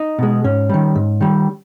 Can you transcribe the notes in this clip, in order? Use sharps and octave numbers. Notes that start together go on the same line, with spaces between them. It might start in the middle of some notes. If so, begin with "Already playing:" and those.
Already playing: D#4
B2 G#3
G#2 C#4
D#3 G3
G#2
D#3 G3